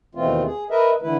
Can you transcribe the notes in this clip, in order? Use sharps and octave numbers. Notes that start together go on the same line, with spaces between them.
D#2 B2 E3 A3 C4 F4
G#4
A#4 B4 D#5 E5
D3 E3 A3 E4 B4